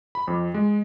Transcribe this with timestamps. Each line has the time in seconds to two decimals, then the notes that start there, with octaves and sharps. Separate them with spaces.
0.15 B5
0.28 F2
0.54 G#3